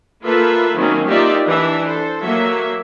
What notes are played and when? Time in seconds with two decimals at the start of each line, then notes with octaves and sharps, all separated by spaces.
0.24 A#3 F4 A4 B4 E5
0.77 D#3 F#3 A#3 C4 C#4
1.08 A#3 D#4 F4 G4 D5 E5
1.48 E3 D4 E5
1.85 A4 C5
2.23 F#3 A#3 E5